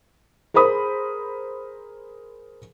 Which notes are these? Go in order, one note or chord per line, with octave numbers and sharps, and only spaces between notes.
G#4 A#4 C5 B5 D#6